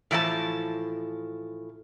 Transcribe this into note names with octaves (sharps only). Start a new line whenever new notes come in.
A2 E3 F3 D#5 A5